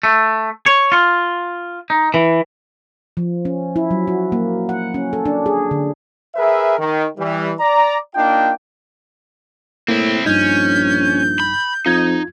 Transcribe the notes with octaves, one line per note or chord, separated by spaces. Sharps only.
A3
C#5
F4
D#4
E3
F3
C#4
E4
F#3
F#4
A#3
F#5
C#4
A4
D4
G#4
D3
G#4 A#4 B4 E5
D#3
E3 G3
D5 A#5
A#3 D4 D#4 F4 G5
A2 A#3 C4 E4
A#1 G2 G3 C#4 D#4 G6
B5
F2 D#4 F4 G#6